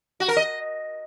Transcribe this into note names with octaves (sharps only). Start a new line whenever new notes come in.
F#4
A#4
D#5